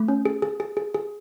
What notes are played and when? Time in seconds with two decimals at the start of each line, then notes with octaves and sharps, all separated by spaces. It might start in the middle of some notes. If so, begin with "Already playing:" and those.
Already playing: A3
0.08 C#4
0.25 G#4
0.42 G#4
0.60 G#4
0.77 G#4
0.94 G#4